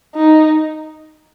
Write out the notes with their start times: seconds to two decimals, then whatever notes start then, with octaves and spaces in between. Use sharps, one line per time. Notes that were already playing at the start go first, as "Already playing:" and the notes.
0.15 D#4